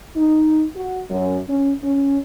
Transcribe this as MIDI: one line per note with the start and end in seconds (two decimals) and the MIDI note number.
0.16 0.65 63
0.75 1.00 66
1.10 1.39 42
1.49 1.72 61
1.83 2.17 61